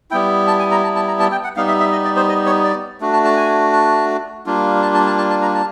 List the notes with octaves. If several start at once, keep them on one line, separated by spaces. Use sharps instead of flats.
G3 B3 E4 G5
A5
G#5
A#5
A5
A5
A#5
A5
G5
F#5
G3 B3 D#4 F5
E5
E5
D#5
D5
C5
D#5
C#5
D5
A3 D4 F#4
A5
A5
G#5
A5
G3 A#3 D4 F4
A5
A5
A5
A5
A5
A#5
A5